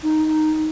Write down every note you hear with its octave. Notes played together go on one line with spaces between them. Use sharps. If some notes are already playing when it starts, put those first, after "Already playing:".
D#4